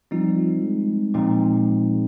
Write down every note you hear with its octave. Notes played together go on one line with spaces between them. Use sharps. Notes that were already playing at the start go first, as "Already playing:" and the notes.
F3 G3 C4 D#4
G#3
A#2 F3 C4 D#4